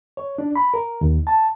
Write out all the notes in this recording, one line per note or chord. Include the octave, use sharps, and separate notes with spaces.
C#5
D4
B5
A#4
D#2
A5